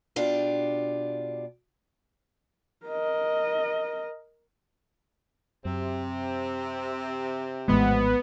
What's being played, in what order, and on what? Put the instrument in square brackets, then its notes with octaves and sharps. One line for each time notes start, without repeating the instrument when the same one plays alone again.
[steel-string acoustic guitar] B2 D4 F4 G4
[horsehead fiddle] A#4 D#5
[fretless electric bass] F#2 [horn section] C3 C4
[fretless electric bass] A#1 A2 E3 [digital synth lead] G#3 [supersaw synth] B3